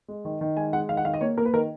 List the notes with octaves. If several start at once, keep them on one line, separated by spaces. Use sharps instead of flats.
G#3
D#3
D#3
G#3 G#5
G#3 F#5
D#3 F5
F#5
D#3 F5
D#5
A#3 C#5
A#3 A#4
B4
D#3 A#4